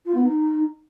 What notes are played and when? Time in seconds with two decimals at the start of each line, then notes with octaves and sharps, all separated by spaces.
0.05 F4
0.14 B3
0.23 D#4